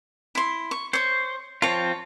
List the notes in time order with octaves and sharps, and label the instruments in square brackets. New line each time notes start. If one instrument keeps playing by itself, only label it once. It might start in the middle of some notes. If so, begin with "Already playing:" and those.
[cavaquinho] E4 C6
C#6
[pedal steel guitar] C5 [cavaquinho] C#5 C#6
[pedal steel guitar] F3 C4 F4 [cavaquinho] C#5 A5